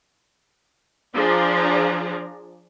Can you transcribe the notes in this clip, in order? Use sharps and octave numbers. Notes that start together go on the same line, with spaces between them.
F3 D4 G#4 D5 A#5